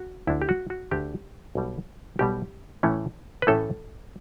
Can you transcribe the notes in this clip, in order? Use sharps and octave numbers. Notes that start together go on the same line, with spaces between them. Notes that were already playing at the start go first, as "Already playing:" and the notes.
Already playing: F#4
D2 D3 A3 D4 E4
G4
F#4
F#4
D2 D3 A3 D4 G4
B1 B2 G3
B1 B2 G3 G4
A2 E3 A3 C#4 E4
B4
A2 E3 A3 C#4 E4 A4